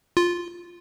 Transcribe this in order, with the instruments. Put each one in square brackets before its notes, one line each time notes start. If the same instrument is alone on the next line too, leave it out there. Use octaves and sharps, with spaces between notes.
[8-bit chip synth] F4